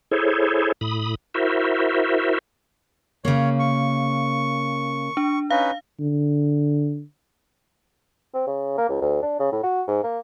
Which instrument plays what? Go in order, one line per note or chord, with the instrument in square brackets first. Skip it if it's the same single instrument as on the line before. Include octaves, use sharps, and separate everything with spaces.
[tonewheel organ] E4 G#4 A4 C5 C#5
A2 B5 D#6
E4 F#4 A#4 C5 E5
[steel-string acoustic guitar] C#3 A#3 [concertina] C#5
[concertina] C#6
[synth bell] D4
[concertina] C#4 D#4 B4 [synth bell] F5
[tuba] D3
[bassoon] C4
C#3
A#3
C#2
D2
D4
C#3
A2
F#4
G#2
A#3